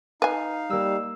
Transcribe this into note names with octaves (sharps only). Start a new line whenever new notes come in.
D#4 B4 F5 G#5
G3 A#3 E6